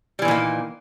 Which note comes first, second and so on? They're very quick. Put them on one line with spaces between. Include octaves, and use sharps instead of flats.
G3 E3 A#2 D#3 A#3